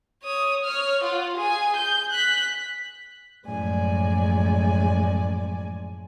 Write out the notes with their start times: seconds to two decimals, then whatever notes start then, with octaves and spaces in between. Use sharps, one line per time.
0.23 C#5 D#6
0.65 C#5 F6
1.03 F4 F#5
1.37 G#4 G#5
1.76 G6
2.11 F#6 B6
3.45 F#2 A2 F3 G#3 D5 G#5